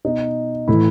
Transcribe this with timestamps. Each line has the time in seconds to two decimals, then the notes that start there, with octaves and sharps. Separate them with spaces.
0.05 B2 D#4
0.68 A2 E3 E4